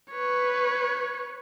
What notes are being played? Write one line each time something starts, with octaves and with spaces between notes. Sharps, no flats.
B4 C#5